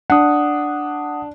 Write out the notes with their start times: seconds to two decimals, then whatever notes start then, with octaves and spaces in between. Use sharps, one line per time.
0.10 D4 F#5 D#6